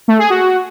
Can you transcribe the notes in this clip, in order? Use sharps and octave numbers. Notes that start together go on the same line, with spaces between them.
A3
G#4
F#4